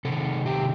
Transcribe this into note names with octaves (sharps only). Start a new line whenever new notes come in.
C3 D#3 A4
G4